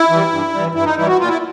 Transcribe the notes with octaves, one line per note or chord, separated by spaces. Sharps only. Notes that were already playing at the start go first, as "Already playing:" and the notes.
Already playing: E4
E3 G3
G2
E3 G3
G2 E4
D#4
E3 G3 E4
F#4
A#2 F4
E4